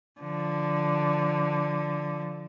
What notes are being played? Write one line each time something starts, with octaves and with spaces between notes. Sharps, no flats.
D3 F3